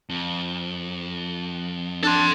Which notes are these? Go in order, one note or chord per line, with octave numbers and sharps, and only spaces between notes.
F2
D4 A4 C6